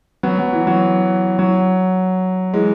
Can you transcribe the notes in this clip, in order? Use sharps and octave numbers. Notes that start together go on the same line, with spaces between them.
F#3 B3
F#3
E3
F#3
F#3
E3 G#3